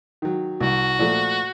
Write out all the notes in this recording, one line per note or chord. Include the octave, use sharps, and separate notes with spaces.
D#3 F#3
C2 F#4
A#2 F3 A3